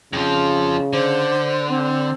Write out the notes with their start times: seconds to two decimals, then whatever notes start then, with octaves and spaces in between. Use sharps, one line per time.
0.13 F2 C#3 F3
0.93 D3 C5
1.69 C4